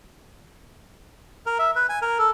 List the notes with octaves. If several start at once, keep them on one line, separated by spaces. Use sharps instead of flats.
A#4
E5
B4
G#5
A#4
A4